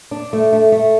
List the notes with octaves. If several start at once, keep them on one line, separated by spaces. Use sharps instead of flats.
D4
A3
A3
A3